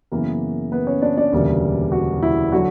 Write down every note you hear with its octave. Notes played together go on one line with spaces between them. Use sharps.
F#2 C#3 E3 A#3 B3 A#4
B3 B4
C#4 C#5
D4 D5
D4 D5
E1 D2 C#3 G3 A#3
F#4
E4
D3 F#3 F#4